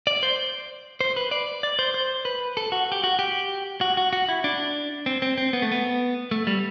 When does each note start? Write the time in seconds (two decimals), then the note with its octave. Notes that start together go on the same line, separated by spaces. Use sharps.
0.07 D5
0.23 C5
1.01 C5
1.16 B4
1.31 D5
1.63 D5
1.79 C5
1.94 C5
2.25 B4
2.57 A4
2.72 F#4
2.92 G4
3.04 F#4
3.19 G4
3.81 F#4
3.97 F#4
4.13 F#4
4.29 E4
4.44 D4
5.06 C4
5.22 C4
5.38 C4
5.53 B3
5.62 A3
5.72 B3
6.31 A3
6.47 G3